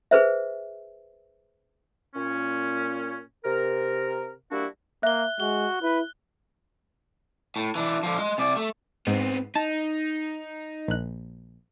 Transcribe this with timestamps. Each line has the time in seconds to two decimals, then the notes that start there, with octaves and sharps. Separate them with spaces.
0.11 G#4 B4 C5 E5
2.15 A#2 C#4
3.44 C3 A#4
4.51 G3 A#3 D4 E4 F#4
5.03 A#3 E5 F#6 G7
5.40 G#3 F#4 G7
5.82 E4 B4
7.56 A2
7.75 E3 D4
8.03 D3 F3
8.18 D#5 C6
8.38 C3 D5
8.56 A3
9.07 G#2 B3 C4
9.55 D#4 A5
10.88 A#1 F#6